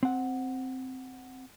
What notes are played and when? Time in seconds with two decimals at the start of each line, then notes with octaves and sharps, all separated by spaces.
0.03 C4 F#5